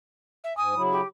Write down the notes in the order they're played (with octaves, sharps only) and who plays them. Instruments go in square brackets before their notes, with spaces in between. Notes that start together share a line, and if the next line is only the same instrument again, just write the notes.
[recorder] E5
[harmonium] G#2 G#5 [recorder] D#6
[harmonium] C#3 F#3 E4
[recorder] G4